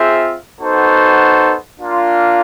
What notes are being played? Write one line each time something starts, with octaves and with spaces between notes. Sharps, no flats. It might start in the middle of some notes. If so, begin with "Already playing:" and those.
Already playing: C4 F4 G#4 C5 E5
B3 D#4 F#4 A4 C5
A#3 D4 F4